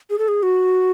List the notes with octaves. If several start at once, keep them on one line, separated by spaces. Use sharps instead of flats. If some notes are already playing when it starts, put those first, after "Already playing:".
G#4
A4
G#4
F#4